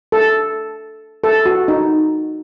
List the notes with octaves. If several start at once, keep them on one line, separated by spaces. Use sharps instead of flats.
A4
A4
F#4
D#4